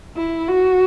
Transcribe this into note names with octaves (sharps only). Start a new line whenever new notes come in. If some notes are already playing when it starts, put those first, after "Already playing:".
E4
F#4